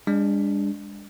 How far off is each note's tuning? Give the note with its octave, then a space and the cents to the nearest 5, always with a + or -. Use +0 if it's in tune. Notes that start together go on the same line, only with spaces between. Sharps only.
G#3 -40 D4 -15